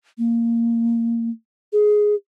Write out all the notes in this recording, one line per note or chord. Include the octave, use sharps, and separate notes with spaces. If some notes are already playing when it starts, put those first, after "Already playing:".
A#3
G#4